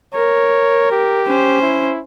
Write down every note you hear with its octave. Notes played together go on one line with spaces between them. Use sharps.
A#4 C#5
G4
C#4 C5
E4